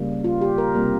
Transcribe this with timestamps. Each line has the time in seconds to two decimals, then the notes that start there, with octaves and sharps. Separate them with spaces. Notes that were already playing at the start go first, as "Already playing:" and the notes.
Already playing: C#3 G3 A#3
0.24 F4
0.41 G4
0.58 A#4
0.75 C3 G3 A#3